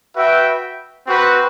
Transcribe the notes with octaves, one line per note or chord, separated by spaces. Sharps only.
F#4 B4 E5 G5
C4 F#4 B4